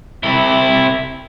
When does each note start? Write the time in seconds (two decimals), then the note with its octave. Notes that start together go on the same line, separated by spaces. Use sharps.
0.23 C3 E4